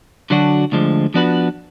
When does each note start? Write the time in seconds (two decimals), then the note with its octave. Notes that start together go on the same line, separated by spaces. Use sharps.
0.30 D3 F#3 D4 F#4
0.72 D2 D3 F3 G#3
1.14 F3 B3 D4 F#4 B4